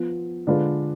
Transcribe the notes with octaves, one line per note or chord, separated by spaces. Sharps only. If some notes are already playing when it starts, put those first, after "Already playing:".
Already playing: F3 B3 F4
D3 G#3 D4 F4 B4